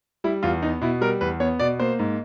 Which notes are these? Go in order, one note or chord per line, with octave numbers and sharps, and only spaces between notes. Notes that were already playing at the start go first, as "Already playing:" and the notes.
G3 E4
E2 F4
B3 D#4
B2 E4
G3 A#4
E2 B4
B3 C#5
B2 D5
A#3 C5
G#2